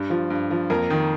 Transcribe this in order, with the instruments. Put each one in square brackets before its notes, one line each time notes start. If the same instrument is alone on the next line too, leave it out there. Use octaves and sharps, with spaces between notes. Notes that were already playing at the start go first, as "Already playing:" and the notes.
Already playing: [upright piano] G2
F3
G2
F3
F2 A#3 A#4
D#3